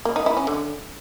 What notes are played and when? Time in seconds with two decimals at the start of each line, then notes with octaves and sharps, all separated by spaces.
0.05 A#3
0.16 D#4
0.26 E4
0.37 C#4
0.47 D3